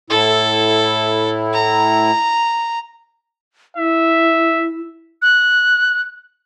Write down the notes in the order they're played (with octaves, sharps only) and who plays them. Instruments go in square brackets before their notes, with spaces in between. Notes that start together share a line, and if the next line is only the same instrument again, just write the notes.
[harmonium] A2 E4 [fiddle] A4
[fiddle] A#5
[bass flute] E4 [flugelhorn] E5
[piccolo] F#6